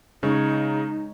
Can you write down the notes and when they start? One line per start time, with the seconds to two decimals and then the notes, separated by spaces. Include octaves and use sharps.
0.23 C#3 G#3 D#4 C#5